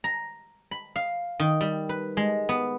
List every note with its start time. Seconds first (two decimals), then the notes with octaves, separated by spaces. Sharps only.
0.04 A#5
0.71 B5
0.96 F5
1.40 D#3
1.61 G3
1.89 B4
2.17 G#3
2.49 B3